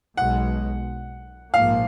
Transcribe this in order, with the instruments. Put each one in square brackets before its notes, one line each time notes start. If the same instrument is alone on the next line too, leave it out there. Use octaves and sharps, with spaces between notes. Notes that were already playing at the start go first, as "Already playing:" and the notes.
[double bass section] B1 B2 G#3 [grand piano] F#5
[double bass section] A#1 G#2 F3 A#3 [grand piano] F5